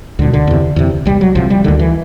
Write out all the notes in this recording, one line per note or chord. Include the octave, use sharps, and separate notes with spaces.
C#2 B2 D3
D3
E2 C3
E2 C3
C2 C3 G3
F#3
C2 C3 F3
G3
D2 D3 D#3
E3